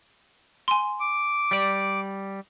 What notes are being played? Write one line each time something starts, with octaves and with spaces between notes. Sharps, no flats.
G#5 C6
D6
G3 D5